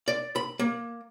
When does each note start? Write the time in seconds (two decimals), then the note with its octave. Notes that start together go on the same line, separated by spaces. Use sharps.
0.08 D5
0.36 B5
0.59 A#3